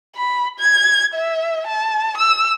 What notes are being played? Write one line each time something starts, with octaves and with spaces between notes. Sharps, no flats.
B5
G#6
E5
A5
E6